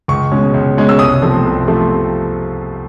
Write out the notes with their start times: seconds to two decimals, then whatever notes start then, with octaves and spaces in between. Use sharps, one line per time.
0.08 C#2 C#6
0.31 B2 G#3 C#4
0.54 C#2
0.77 B2 G#3 C#4
0.89 E6
0.99 C2 D#6
1.22 C3 F3 A3 C4
1.44 C2
1.67 C3 F3 A3 C4